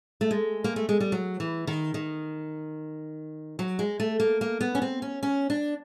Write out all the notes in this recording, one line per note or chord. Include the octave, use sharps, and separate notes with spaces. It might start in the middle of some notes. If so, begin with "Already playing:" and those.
A3
G#3
A#3
A3
G#3
G3
F#3
E3
D#3
D#3
F#3
G#3
A3
A#3
A#3
B3
C#4
C4
C#4
C#4
D4